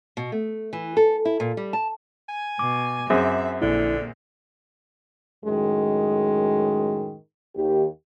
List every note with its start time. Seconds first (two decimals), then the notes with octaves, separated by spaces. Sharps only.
0.17 B2
0.32 A3
0.73 E3
0.97 A4
1.25 E4
1.40 A#2
1.57 G3
1.73 A5
2.29 G#5
2.59 B2 D6
3.10 F#2 C4 G#4 E5
3.62 A#1 A#2 D3 A#3 E4
5.45 F#2 A2 D#3 G#3
7.56 D#2 G4